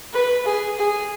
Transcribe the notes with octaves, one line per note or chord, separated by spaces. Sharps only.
B4
G#4
G#4